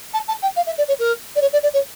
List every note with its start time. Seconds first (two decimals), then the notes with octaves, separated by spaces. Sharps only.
0.13 A5
0.28 A5
0.42 G5
0.56 F5
0.66 E5
0.78 D5
0.88 C#5
0.99 A#4
1.35 D5
1.41 C#5
1.53 D5
1.63 D5
1.73 C#5